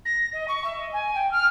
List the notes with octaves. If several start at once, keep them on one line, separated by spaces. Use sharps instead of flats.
A#6
D#5
C#6
E5
D#5
G#5
G5
F6